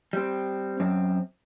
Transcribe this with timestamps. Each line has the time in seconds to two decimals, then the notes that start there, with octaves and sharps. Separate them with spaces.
0.13 G3 C4
0.80 F#2 C4